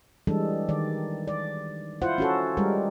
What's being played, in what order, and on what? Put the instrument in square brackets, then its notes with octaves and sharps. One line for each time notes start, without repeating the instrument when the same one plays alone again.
[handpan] E3 G3 G#3 D4 A4
D#3 D5
D5
E4 F4 C5 F#5
C#4 F#4 A4
G3 G#3 A#4